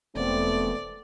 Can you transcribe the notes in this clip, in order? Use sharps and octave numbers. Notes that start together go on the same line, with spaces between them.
E1 A3 B3 C4 D5